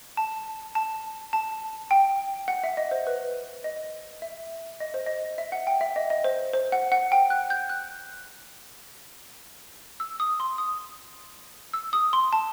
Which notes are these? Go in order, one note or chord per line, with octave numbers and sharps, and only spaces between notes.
A5
A5
A5
G5
F#5
E5
D#5
C5
B4
D#5
E5
D#5
C5
D#5
E5
F#5
G5
E5
D#5
D#5
C5
C5
F#5
F#5
G5
F#6
G6
F#6
E6
D#6
C6
D#6
E6
D#6
C6
A5